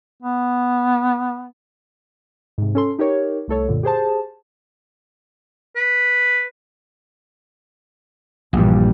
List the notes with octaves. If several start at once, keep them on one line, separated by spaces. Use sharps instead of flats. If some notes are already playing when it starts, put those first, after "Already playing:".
B3
G#2 C3
C#4 A4 C6
D#4 G4 A#4 C#5
C2 A3 A4 C#5
F#2 A#2 D3
G4 G#4 C5 A5
B4
A#1 G2 A#2 E3 G3